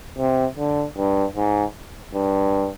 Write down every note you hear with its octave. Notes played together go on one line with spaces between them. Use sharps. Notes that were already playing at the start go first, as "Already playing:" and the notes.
C3
D3
G2
G#2
G2